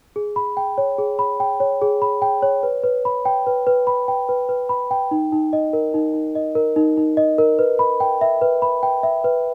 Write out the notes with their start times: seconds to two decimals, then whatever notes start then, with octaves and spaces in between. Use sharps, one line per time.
0.16 G#4
0.36 B5
0.57 G5
0.78 C#5
0.98 G#4
1.19 B5
1.40 G5
1.60 C#5
1.82 G#4
2.02 B5
2.22 G5
2.43 C#5
2.63 B4
2.84 B4
3.05 B5
3.25 G5
3.47 B4
3.67 B4
3.87 B5
4.08 G5
4.29 B4
4.49 B4
4.69 B5
4.91 G5
5.11 D#4
5.32 D#4
5.53 D#5
5.73 A#4
5.94 D#4
6.14 D#4
6.35 D#5
6.55 A#4
6.76 D#4
6.98 D#4
7.17 D#5
7.38 A#4
7.59 B4
7.79 B5
8.00 G5
8.21 E5
8.41 B4
8.62 B5
8.83 G5
9.03 E5
9.24 B4